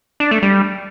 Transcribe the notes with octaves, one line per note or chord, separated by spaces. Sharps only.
D4
A3
G3